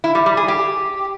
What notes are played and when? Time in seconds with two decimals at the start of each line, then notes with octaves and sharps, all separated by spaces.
0.04 E4
0.15 G3
0.26 G3
0.37 G#4
0.48 G4